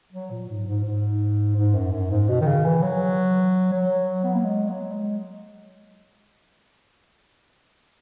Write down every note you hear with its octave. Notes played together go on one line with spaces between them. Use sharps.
F#3
A#2
G#2
G#2
G#2
G#2
F#2
F#2
G#2
B2
D#3
C#3
E3
F#3
F#3
B3
A#3
G#3
F#3
G#3